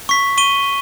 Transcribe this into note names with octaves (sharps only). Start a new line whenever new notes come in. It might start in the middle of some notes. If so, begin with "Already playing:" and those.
C#6 B6
C#6 D#7 G7